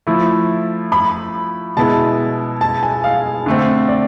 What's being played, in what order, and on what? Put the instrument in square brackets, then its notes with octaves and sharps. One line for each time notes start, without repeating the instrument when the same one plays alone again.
[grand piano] F3 A3 E4
[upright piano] B5
[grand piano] B2 G#3 B3 E4 [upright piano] A5
[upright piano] A5
G#5
F5
[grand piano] D3 A3 C4
[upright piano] D5